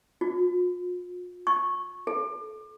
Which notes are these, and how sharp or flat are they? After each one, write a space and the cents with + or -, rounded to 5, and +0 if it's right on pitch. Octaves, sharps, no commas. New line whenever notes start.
F4 +40
C#6 -10
A4 -30